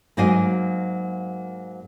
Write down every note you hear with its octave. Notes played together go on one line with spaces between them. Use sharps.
G#2 F#3 A#3 D#5 F5 G#5